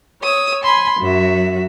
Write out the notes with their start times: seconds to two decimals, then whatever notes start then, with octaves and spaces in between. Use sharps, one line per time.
0.21 C#5 D#6 E6
0.62 G#5 B5 C6
0.99 F#2 F#3 F#4 E5